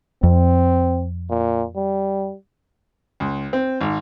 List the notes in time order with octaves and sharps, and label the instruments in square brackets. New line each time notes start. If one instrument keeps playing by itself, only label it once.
[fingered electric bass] F2 [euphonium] C4
[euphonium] A#2
G3
[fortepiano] C#2
C4
G#1